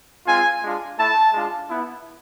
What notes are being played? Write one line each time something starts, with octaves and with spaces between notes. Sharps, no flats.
G#3 C4 F4 G#5
G#3 D4 F4
A3 E4 A5
G#3 D4 F4
B3 E4